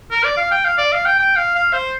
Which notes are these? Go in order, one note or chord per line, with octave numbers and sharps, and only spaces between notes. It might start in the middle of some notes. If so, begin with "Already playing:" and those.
A#4
D5
F5
G5
F5
D5
F5
G5
G5
F5
F5
C5